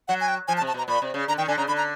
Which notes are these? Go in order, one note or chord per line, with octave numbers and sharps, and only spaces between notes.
F#3 F#5
G#5
G5
F3 G#5
A5
C3
A5
B2 A#5
A#2 B5
C3
C#3
D3 A#5
D#3 G5
D3 G#5
C#3 A#5
D3 B5
A#5